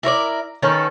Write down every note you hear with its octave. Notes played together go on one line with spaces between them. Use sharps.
E4 A#4 C#5 D5
D#3 C#4 A4 B4